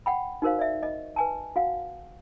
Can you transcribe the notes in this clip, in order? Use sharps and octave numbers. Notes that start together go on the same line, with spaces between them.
F#5 G5 B5
D#4 F#4 A#4 C5 F5
D5 E5
D#5
B4 G#5 A5
F#4 F5 F#5